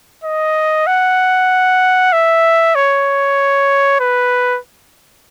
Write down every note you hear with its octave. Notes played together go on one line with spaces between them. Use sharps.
D#5
F#5
E5
C#5
B4